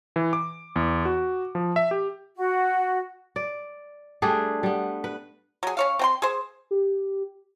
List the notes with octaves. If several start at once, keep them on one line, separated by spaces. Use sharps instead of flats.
E3
D6
E2
F#4
F3
E5
G4
F#4
D5
G3 A3 D4 G#4
G3 B3
B4
F#3 G#4
C#4 C#5 F5
C4 G5 C6
G#4 C5
G4